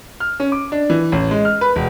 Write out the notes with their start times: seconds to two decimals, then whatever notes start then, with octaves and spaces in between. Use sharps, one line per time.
0.20 F6
0.40 C#4
0.52 D6
0.72 D4
0.90 E3
1.12 A1
1.31 G#3
1.45 F6
1.61 B4
1.76 E1